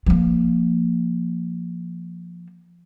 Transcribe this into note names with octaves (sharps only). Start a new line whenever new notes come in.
F3 A#3